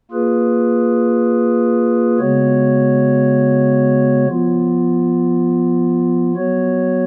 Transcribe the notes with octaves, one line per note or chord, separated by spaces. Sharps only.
A#3 F4 G#4 B4
C#3 G#3 B3 F#4 C#5
F3 B3 F4
F#3 B3 F#4 C#5